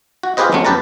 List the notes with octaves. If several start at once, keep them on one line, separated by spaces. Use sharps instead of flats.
F#4
F4 G4 G#4 B4 C5 D#5
E2 F#3 G#3 A3 C#4
F#2 G4 B4 A5 A#5